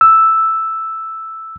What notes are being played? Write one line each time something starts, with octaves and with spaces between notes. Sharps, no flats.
E6